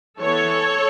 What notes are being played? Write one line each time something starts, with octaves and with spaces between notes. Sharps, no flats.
E3 B3 A4 C#5